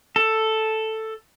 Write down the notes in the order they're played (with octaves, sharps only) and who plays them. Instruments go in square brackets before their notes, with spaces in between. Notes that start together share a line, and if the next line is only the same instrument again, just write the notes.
[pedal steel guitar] A4